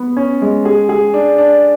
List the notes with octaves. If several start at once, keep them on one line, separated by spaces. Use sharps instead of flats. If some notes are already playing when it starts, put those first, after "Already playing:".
Already playing: B3
C#4
G#3
G#4
G#4
D4
D4